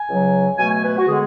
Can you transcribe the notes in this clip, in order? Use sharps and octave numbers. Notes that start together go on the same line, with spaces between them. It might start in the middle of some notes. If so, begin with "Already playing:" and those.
Already playing: G#5
C#2 C#3 F#3
B2 A3 G#5
G#5
B4
F#4
D3 G#3 B3 G#4